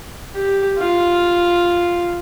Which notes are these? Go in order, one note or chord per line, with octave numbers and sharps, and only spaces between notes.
G4
F4